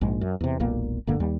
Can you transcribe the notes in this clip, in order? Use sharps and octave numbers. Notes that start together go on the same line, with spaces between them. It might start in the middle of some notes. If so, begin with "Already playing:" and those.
A#1 G#2 G#3
F#2
E2 C3
E1 B1 A#2 A#3
E1 G2 D3 A#3
D#2 G3